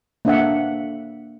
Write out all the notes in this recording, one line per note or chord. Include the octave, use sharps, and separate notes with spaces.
A#3 D4 E5 F#5